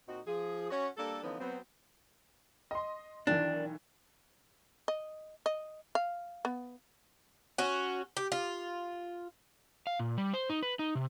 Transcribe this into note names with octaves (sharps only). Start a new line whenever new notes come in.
A#2 C4 D#4 F#4
F3 G#4
C#4 F#4 C#5
G3 A#3 D4 A4
D3 E3 F3 B3 C#4 D#4
F#3 B3 C4
D#5 C6
B1 D#3 E3 D4
D#5
D#5
F5
B3
C#4 F#4
G4
F4
F5
A#2
G3
C5
D#4
B4
D#4
C3